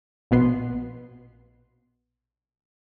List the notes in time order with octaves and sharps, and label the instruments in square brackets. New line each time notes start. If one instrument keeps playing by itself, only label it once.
[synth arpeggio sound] A#1 B2 B3 C6